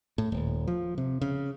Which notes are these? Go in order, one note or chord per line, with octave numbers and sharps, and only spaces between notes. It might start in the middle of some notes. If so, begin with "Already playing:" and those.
A2
D#1
F3
C3
C#3